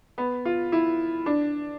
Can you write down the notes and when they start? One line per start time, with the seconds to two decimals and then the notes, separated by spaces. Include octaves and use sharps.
0.18 B3
0.45 F4
0.72 E4
1.26 D4